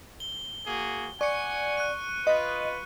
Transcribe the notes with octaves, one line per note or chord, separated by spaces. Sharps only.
G7
A#3 F#4 G#4
D5 F#5 G#5 C#6 C#7
F#6 D#7
F4 B4 D#5